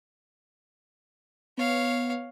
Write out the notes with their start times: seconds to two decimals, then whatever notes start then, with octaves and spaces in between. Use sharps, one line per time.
1.57 B3 C#5 F5